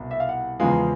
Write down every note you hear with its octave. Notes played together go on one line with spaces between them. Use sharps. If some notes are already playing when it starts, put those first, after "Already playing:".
Already playing: C2 B2
E5
F5
F#5
E2 C#3 F3 G#3 B3 F5